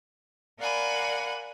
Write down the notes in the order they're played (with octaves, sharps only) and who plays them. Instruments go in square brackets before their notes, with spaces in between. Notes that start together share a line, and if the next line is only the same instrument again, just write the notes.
[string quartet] A#4 D5 F5 F#5 G#5 B5